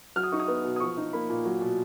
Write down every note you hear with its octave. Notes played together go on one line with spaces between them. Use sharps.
F#3 F6
D#6
D#4 C#6
D#6
B3
B2
D#6
F3 C#6
D#4
A#3 B5
A#2
F#3
B2